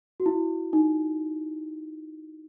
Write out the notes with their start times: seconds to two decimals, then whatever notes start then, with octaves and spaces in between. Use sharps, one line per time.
0.20 F#4
0.26 E4
0.73 D#4